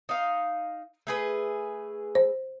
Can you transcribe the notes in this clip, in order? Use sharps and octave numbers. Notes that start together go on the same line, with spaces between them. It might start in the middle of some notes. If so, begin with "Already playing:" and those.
D#4 F5
A3 G#4 B4
C5